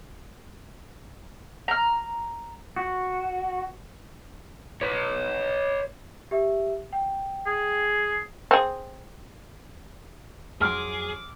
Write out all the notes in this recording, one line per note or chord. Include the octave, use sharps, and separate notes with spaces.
A#5 F6
F#4
B4 C#5
G4 E5
G5
G#4
C4 G#4
F2 F#3 G#4 C6 D6 F6